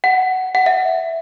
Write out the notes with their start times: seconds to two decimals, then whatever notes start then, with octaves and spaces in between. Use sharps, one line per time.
0.04 F#5
0.55 F#5
0.66 E5